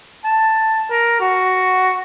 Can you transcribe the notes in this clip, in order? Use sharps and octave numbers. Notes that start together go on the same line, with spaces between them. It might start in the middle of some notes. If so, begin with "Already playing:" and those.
A5
A#4
F#4